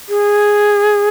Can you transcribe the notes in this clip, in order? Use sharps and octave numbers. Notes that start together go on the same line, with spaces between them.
G#4